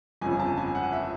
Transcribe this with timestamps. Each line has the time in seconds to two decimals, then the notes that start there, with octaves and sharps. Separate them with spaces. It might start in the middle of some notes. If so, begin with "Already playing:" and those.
0.21 G1 F2 C#3 G#5
0.40 A5
0.57 G#5
0.75 F#5
0.93 E5